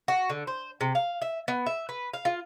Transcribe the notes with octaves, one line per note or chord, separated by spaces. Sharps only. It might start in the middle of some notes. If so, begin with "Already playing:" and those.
F#4
D3
C5
C3
F5
E5
B3
E5
B4
F5
F4